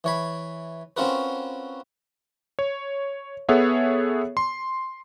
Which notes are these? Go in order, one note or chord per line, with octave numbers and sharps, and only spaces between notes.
E3 C#5 B5
C4 C#4 F4 F#4 A#4 B4
C#5
B3 G#4 A4 C#5 E5 F#5
C6